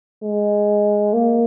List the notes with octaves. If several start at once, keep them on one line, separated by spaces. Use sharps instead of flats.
G#3
A#3